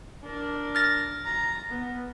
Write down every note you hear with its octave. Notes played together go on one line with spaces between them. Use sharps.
D4 A#4
F6 A6 A#6
A#5
B3